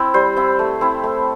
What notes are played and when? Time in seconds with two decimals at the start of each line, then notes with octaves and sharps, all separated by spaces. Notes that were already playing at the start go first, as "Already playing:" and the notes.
Already playing: C4 E4
0.14 G3 C5
0.37 C4 E4
0.59 A3
0.81 C4 E4
1.04 A3